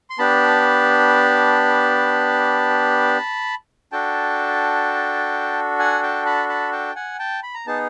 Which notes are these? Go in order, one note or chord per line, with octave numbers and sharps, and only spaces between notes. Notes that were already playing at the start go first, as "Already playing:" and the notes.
C6
B3 D4 G4 A5 B5
D4 F#4 A4 G5 A5
F#5 G#5
G5 A5
A5 B5
A5 B5
G5 A5
F#5 G#5
G5 A5
B5
A#5
B3 D#4 G#4 A5